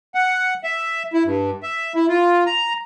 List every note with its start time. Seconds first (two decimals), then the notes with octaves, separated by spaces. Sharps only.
0.15 F#5
0.64 E5
1.13 E4
1.25 G2
1.63 E5
1.95 E4
2.09 F4
2.46 A#5